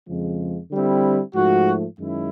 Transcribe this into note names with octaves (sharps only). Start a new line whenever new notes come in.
F2 C#3 F3 G#3
D3 G3 C4 E4
G#2 F3 A3 F#4
F#2 D#3 G#3 C#4 E4